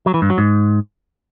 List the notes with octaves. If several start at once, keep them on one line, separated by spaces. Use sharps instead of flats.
F#3
E3
G2
F#3
G#2